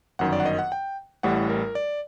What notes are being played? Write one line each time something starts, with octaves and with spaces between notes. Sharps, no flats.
G1 F#2 D#3 F#5
D5
F#5
D#5
F#5
G5
A1 A2 G3 F#5
A#4
D5